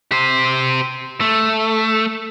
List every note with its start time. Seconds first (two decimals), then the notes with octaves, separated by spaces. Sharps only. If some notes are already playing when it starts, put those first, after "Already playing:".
0.12 G4 C5
1.21 A3